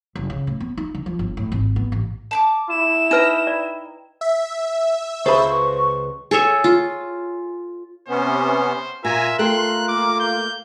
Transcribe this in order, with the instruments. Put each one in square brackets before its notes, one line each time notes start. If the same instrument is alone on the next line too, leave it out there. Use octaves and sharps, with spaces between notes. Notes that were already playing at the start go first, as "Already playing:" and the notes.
[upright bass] F#1
C#3
A2
B3
D#4
D3
F3
G1
A2
G#1
B3
A1
[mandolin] A5 B5 D6
[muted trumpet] E4 [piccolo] E7
[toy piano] D#4 B4 [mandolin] D#5 G5 A#5
[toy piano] D5
[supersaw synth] E5
[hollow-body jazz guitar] C#2 G#4 B5 [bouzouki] B4 C5 A5 [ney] C#6
[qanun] G#4 A4 C#5 E5
F4
[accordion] C3 B3 C#4 [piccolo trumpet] C5
[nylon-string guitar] A#2 [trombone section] F4 A#4 [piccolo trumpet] E5 [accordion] G#5 A#5
[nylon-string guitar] A3 A4 G5 [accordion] C6 [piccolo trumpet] F#6
[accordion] A#3 [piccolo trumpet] D6
[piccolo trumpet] G6